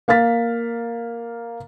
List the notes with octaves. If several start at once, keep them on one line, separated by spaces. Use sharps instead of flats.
A#3 F5 F6 A6 B6